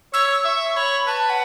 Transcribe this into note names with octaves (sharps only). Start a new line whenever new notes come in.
C#5 E6
E6
E5 C#6
C#5 B5
B4 A5
F#5